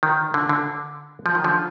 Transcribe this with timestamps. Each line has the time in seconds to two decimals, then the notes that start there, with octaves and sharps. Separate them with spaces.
0.03 D#3
0.34 D3
0.49 D3
1.26 F3
1.35 D#3
1.44 D3 F3